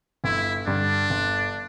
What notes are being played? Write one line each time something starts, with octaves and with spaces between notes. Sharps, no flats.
G1 E4
G2 D3 D4
G1